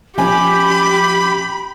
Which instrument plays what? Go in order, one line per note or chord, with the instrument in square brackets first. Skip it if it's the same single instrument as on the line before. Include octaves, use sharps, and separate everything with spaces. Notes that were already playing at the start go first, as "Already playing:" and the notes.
[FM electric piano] F3 C#4 [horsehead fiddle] G4 [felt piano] G#5 [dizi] B5